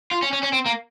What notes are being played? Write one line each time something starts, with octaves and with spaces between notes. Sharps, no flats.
F4
C#4
C#4
C#4
C4
A#3